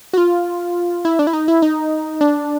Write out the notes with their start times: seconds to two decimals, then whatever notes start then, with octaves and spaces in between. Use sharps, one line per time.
0.13 F#4
0.18 F4
1.05 E4
1.19 D4
1.27 E4
1.33 D#4
1.48 E4
1.62 D#4
2.21 D4